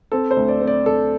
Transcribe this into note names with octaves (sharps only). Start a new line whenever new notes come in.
C4 A4
C5
D2
D5
C4
D5
D2 A4